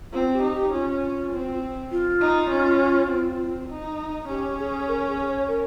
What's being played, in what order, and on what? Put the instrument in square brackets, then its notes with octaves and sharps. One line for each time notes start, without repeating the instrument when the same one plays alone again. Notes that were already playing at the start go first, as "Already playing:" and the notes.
[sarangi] C4 [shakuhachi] F4
[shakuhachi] G4
[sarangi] D#4
[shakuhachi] G4
[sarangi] C#4 [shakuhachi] F4
[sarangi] C4
[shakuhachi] F4
[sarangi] D#4
C#4
C4
D#4
[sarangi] C#4 [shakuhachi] G4
[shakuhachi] G#4
A#4
G#4
C#5
A#4